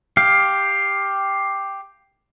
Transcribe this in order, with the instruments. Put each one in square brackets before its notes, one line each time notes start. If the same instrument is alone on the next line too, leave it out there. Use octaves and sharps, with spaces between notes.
[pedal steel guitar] G4 F5